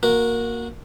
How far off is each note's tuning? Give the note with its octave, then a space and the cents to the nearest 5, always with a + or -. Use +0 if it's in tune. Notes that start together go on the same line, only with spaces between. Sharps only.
A#3 +0 F#4 -20 A#4 +0